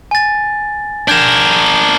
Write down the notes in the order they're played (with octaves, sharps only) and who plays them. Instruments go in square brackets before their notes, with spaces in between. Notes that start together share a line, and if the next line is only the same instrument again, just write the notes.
[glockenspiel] G#5 A6
[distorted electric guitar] D4 A#4 [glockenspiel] G6 G#6 E7